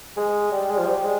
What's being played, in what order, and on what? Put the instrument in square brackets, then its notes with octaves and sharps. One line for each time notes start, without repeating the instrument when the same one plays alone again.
[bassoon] G#3
G3
G#3
F3
G3
G#3